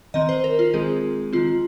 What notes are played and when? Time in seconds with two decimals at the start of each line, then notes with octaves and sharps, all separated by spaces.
0.14 D#3 C4 D#5
0.29 C5
0.44 A#4
0.59 F4
0.74 D#3 G#3 C4 G#4
1.33 D#3 C4 F4